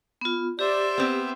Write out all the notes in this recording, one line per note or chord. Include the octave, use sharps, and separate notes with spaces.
B3 F4
G4 C5 D5 E5
B3 C4